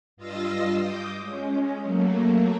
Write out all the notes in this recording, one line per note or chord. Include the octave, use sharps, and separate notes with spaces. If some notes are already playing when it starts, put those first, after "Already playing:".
G2 F4 D#5 F5 E6 A#6
D6 D#6 G6
G#3 C#4
F#3 A3 A#3